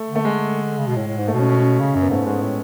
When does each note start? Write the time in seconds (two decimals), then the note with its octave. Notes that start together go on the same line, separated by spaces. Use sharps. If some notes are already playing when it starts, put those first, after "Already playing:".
Already playing: A3
0.09 D3
0.15 A3
0.25 G#3
0.78 C#3
0.87 B2
0.97 A2
1.07 A2
1.18 G#2
1.28 A3
1.33 B2 C#4
1.49 C#4
1.80 C#3
1.95 F#2
2.01 B3
2.11 G#2 A3
2.26 G#2 G#3
2.42 A2